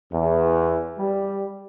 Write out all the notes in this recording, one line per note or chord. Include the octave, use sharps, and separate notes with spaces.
E2
G3